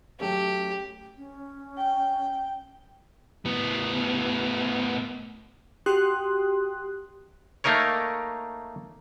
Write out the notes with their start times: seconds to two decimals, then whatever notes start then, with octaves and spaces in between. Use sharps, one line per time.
0.20 F#3 A3 C#4 G4
1.18 C#4
1.77 G5
3.45 A2 B3
5.86 F#4 G4 G5 C6 D#6 F#6
7.64 A3 A#3 D#4 A#4 C#5